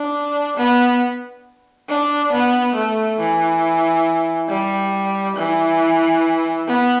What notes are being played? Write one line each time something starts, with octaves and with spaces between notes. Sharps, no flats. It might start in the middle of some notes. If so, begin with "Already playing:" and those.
Already playing: D4
B3
D4
B3
A3
E3
G3
E3
B3